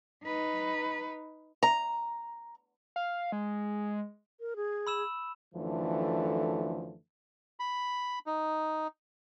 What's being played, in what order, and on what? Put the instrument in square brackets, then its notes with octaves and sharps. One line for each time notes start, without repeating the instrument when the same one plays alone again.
[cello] D#4 B4
[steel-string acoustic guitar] A#5
[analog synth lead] F5
G#3
[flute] A#4
G#4
[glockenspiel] B5 E6 E7
[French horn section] F#2 D3 E3 F3 A3
[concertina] B5
D#4